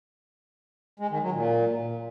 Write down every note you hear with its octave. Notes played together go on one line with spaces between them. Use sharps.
G#3
D#3
F#3
A#2